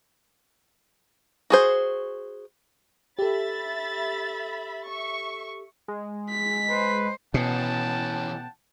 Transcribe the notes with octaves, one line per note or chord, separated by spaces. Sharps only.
F#4 G#4 C5
G4 A4 E5 B5 A6
E5 C#6
G#3
B6
B4 C5
B2 E3 C#4 F#5 G5 A5